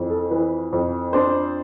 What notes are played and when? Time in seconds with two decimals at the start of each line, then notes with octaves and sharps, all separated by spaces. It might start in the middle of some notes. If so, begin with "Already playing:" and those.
Already playing: F2 E3
0.10 A4
0.30 E3 B4
0.73 F2
1.13 D4 C5